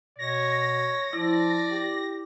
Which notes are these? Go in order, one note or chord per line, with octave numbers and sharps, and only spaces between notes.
B2 C#5 A#6
F3 E4 D5
G4